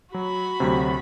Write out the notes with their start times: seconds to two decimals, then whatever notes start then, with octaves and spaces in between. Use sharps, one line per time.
0.14 F#3 F#4 B5
0.60 D2 C3 F#3